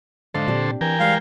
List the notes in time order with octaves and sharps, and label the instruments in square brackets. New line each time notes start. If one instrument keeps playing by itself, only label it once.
[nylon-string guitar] G#2 D#5 F5 [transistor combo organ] D3 A4 C5
[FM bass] A#2 [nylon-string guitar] C4 D4 G4
[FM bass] E3 [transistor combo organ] A#4 G5 G#5
[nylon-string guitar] G3 G#3 C5 [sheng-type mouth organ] F5